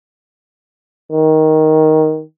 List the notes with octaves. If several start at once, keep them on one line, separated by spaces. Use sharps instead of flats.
D#3